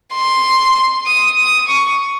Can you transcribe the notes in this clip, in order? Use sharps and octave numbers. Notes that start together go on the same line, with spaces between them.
C6
D#6
D#6
C#6